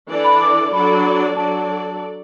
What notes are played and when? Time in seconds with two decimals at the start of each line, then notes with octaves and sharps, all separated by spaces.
0.09 E3 D4 A4 D5
0.24 B5
0.41 D6
0.73 F#3 D4 A4 D5 B5
1.37 F#3 D4 A4 D5 A5